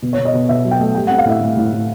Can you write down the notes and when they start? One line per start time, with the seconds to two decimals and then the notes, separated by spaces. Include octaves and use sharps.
0.02 B2
0.13 C#5
0.18 B2
0.25 D#5
0.34 B2
0.49 B2 E5
0.65 F#3
0.71 G5
0.80 A3
0.95 G3 G5
1.07 F#5
1.10 C4
1.19 F5
1.25 A2 E5
1.41 A2
1.57 A2
1.72 A2